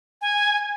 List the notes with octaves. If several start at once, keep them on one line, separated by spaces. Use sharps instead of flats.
G#5